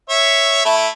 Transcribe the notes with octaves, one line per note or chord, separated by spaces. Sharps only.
C#5 E5
A3 E4